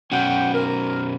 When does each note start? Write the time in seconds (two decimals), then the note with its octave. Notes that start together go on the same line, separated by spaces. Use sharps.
0.12 B2 F#3 C#4 F#5 G5
0.53 A#4